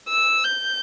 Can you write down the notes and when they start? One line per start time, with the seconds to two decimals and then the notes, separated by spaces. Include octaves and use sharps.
0.09 E6
0.44 G6